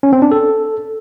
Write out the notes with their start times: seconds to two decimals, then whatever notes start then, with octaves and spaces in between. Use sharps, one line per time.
0.03 C#4
0.13 C4
0.22 D4
0.31 A4